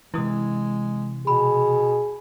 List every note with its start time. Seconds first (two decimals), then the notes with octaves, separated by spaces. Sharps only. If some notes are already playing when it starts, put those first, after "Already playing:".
0.14 C3 E3 G#3 E4 D#6
1.27 B2 G#4 B5